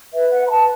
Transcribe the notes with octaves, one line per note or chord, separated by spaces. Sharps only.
B4 E5
F#5
B5
B4 A5